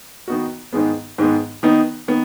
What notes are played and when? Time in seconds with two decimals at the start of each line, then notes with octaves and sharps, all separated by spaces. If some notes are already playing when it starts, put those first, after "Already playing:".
0.28 D#3 B3 D#4 F#4
0.73 G#2 D#3 G#3 B3
1.18 G#2 D#3 G#3 B3
1.63 D#3 B3 D#4
2.08 D#3 B3